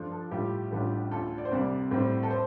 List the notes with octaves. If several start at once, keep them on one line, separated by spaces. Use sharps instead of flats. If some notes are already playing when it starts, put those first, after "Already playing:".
Already playing: G2 F3 D4 F4 A4
A4
A2 G3 F4 G4
A1 A2 G3 D4 F4
D2 D3 A3 F4 A4
D5
C5
C2 C3 G3 D5
A2 G3 C4
A4
C5